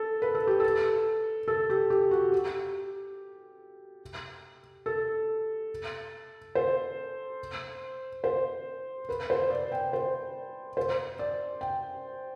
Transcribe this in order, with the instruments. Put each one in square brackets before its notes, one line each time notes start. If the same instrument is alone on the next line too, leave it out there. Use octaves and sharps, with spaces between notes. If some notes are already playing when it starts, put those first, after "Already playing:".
Already playing: [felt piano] A4
B4
A4
G4
A4
A4
G4
G4
F#4
G4
A4
C5
C5
B4
C5
D5
G5
C5
C5
D5
G5